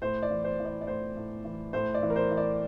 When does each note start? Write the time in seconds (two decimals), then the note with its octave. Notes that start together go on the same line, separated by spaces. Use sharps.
0.02 A2 C5
0.22 D5
0.30 E3
0.44 C5
0.59 E3
0.65 D5
0.81 D5
0.87 A2 C5
1.16 A2
1.44 E3
1.73 A2 C5
1.94 D5
2.02 E3
2.10 A#4
2.16 C5
2.31 E3
2.37 D5